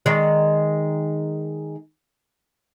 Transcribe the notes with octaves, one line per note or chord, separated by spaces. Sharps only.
D#3 G#3 D5